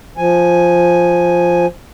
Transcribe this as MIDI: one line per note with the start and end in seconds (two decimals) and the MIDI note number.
0.18 1.66 53
0.18 1.66 80